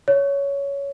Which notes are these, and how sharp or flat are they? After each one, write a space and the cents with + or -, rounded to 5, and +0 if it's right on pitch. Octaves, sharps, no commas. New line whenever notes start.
C#5 +15